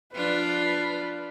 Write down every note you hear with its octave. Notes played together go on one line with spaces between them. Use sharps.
F3 D4 F4 B4